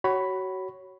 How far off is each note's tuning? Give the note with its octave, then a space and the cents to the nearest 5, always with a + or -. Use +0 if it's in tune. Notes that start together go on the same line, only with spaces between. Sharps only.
F#4 +25 C#5 +0 B5 +0